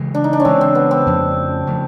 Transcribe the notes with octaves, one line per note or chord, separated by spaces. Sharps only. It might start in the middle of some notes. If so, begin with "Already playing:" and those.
Already playing: C#3 E3 G#3
D4
D#4
D4
C#4
C#3 E3 G#3 C4
C4
B3
C4
F2 C#3 F3 A3
C#3 F3 A3